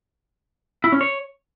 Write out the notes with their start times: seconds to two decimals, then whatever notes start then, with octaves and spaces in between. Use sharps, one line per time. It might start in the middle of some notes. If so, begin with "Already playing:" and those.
0.84 E4
0.92 C#4
1.01 C#5